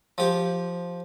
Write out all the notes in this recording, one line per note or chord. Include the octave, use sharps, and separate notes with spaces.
F3 G4